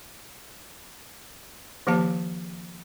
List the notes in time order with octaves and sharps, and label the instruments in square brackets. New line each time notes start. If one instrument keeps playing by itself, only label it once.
[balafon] D#3 F3 A#3 G4 F5 A5